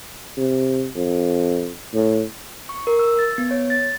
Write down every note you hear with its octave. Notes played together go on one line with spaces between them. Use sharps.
C3
F2
A2
C#6
A#4
E6
A6
B3
C#5
A6